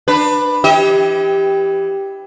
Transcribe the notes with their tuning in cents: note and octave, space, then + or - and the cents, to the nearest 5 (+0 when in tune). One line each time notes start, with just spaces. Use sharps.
D4 +25 B4 +0
E3 +25 G4 +0 D#5 +40